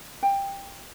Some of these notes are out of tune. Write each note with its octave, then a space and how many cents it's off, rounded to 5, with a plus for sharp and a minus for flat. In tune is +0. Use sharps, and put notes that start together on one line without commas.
G5 +15